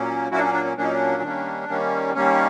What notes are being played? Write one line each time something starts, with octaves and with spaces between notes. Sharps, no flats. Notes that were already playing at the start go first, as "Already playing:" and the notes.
Already playing: A#2 F#3 A#3 C#4
A#2 F#3 A#3 C#4 E4 F#4
D4
C#4
D4
C#4
A#2 F#3 A#3 C#4 D4
D#4
D4
D#3 G3 A#3 C#4
D#3 G3 A#3 C#4
D#3 G3 A#3 C#4